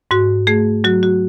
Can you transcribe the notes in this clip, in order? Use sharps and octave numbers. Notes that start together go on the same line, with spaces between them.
G#2 F#4
A3 G#4
F#3 F#4
F#4